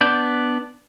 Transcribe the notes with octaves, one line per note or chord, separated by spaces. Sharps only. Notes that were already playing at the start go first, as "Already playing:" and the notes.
B3 D4 D5 G6